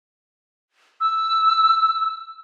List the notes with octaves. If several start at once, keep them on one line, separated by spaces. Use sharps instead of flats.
E6